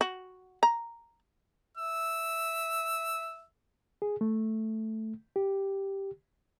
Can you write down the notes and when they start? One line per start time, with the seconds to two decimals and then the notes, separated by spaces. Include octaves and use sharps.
0.01 F#4
0.63 A#5
1.77 E5 E6
4.02 G#4
4.21 A3
5.36 G4